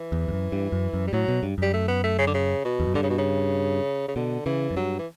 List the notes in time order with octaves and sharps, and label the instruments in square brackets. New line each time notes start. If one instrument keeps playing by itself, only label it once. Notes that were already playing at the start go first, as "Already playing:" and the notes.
Already playing: [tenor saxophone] E3
[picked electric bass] E2
E2
F#2
G2
F#2
F#2
[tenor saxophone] G3
[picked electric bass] A2 [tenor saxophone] F#3
[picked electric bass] B2
G2
[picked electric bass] F#2 [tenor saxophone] G3
[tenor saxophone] A3
B3
A3
C#3
D3
C#3
B2
[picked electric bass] E2
F#2
[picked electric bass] G2 [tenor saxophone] D3
[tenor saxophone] C#3
B2
C#3
C#3
[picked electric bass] B2 [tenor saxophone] D3
[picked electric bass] C#3 [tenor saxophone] E3
[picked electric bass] F#2
[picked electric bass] G2 [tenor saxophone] F#3
[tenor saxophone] E3